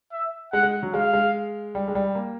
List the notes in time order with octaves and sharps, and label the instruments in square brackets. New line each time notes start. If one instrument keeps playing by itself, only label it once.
[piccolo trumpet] E5
[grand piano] G#3 [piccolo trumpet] F#5
[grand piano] G#3
F#3
[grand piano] G#3 [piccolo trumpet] F5
[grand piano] G#3
G3
G#3
G3
A#3